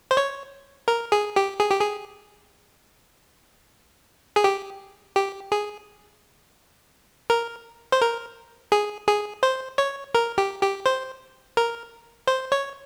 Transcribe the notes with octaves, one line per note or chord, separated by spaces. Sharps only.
C5
C#5
A#4
G#4
G4
G#4
G4
G#4
G#4
G4
G4
G#4
A#4
C5
A#4
G#4
G#4
C5
C#5
A#4
G4
G4
C5
A#4
C5
C#5